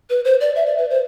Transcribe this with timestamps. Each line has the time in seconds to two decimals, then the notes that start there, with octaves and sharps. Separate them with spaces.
0.10 B4
0.25 C5
0.41 D5
0.56 E5
0.66 D5
0.78 B4
0.90 C5